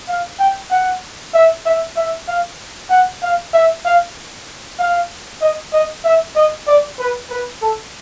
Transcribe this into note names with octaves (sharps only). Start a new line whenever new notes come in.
F5
G5
F#5
E5
E5
E5
F5
F#5
F5
E5
F5
F5
D#5
D#5
E5
D#5
D5
B4
B4
A4